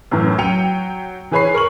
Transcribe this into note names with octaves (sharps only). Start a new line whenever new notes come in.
F#2 A2 E3
F#3 G5 C#7 D#7 F7
E3 G#4 B4 C#5 B5 C7
A#4 C#6 F#7